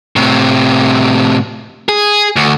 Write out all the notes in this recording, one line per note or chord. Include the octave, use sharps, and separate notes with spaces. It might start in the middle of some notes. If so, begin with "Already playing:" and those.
A2 C3
G#4
D2